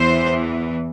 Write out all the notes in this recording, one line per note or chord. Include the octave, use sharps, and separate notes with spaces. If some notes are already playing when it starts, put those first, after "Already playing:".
Already playing: E2 E3 C5